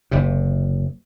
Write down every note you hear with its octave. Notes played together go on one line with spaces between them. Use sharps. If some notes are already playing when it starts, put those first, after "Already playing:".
F#1 C3